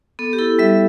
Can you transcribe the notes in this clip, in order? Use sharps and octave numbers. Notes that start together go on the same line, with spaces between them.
B3 A4
G4
E4 A4
G3 E5